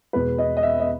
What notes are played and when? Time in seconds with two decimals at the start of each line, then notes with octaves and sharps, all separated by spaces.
0.13 E2 B2 G#3 B4
0.38 D#5
0.57 D#5
0.63 E5
0.80 D#5